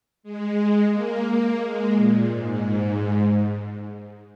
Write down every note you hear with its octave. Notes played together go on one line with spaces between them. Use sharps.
G#3
A#3
A#3
G#3
A#2
G#2